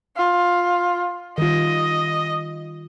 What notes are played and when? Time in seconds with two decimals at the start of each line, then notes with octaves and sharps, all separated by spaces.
0.16 F4
1.38 D#3 G3 F4 D#5